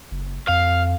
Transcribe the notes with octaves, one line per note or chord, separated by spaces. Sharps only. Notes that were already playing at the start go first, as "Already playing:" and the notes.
F#1
F2 F5